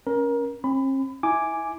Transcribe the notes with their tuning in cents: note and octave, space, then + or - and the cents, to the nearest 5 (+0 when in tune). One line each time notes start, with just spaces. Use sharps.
C#4 +0 A#4 +25
C4 +45 B5 +25
E4 -20 G#5 +0 D6 +0